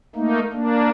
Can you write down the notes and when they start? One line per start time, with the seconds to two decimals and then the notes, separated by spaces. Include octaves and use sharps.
0.16 A3 A#3 D#4
0.53 A#3 D4